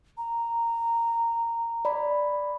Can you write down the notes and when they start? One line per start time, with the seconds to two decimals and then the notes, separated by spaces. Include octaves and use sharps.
0.17 A#5
1.85 D5 B5